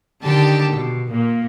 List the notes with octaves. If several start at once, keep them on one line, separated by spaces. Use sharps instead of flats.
D3 D#3 G4 A5
B2
A#2 A#3